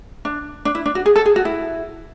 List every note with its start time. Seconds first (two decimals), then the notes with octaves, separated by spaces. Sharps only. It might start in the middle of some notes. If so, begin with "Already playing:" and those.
0.25 D4
0.65 D4
0.75 E4
0.86 D4
0.95 F#4
1.06 G#4
1.16 A4
1.26 G#4
1.36 F#4
1.45 E4